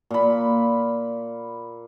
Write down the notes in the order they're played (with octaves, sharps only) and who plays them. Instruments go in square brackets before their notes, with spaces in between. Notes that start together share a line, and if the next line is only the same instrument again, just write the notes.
[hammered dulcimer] A#2 B5